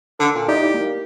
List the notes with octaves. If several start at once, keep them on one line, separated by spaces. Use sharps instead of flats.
D3 A4
A#2
D#4 E4 G4 D5
A#3